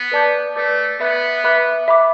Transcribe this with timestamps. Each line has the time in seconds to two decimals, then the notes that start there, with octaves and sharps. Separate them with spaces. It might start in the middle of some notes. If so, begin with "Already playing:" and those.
Already playing: B3
0.12 B4 D5 A5 D6 G6
0.56 A3 B4 D5 A5 D6 G6
0.99 B3 B4 E5 B5 D6 F#6
1.44 B4 E5 B5 D6 F#6
1.88 E5 B5 D6